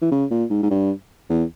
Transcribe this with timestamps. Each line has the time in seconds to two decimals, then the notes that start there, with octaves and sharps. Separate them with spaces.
0.02 E3
0.11 C#3
0.31 A#2
0.50 G#2
0.63 G#2
0.70 G2
1.30 E2